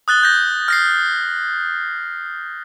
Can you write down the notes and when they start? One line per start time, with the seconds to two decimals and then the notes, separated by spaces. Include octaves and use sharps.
0.08 D#6 F#6 A6 G7
0.23 G6 A#6
0.68 F6 A#6 C7